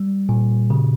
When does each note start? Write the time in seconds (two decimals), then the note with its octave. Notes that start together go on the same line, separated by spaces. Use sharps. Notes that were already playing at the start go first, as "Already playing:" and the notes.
Already playing: G3
0.29 A#2
0.70 C#3